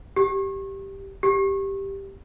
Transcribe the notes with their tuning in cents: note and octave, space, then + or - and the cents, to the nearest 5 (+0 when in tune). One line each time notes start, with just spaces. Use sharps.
G4 -5
G4 +0